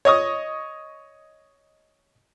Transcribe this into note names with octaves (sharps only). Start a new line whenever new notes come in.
C#5 D#5 C#6 D#6